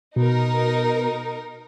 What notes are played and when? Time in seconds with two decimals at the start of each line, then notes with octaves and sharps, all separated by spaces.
0.16 B2 D#4 A#4